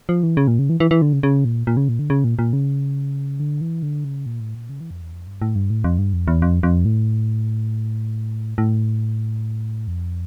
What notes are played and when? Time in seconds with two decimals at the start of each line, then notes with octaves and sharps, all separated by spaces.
0.09 F3
0.23 E3
0.37 C#3
0.48 A#2
0.59 C#3
0.69 E3
0.80 E3
0.91 E3
1.02 D3
1.13 C#3
1.23 C#3
1.45 A#2
1.67 A#2
1.77 C#3
1.89 A#2
1.99 D3
2.10 C#3
2.24 A#2
2.39 A#2
2.53 C#3
3.40 D3
3.61 E3
3.83 D3
4.04 C#3
4.26 A#2
4.40 A2
4.55 A#2
4.69 C#3
4.81 E3
4.91 F2
5.02 E2
5.13 F2
5.27 G2
5.42 A2
5.55 G2
5.70 A2
5.84 F2
5.98 G2
6.13 F2
6.28 E2
6.42 F2
6.63 F2
6.85 A2
8.58 A2
9.88 F2